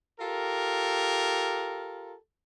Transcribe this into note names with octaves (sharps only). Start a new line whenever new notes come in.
F4 G4 A4 A#4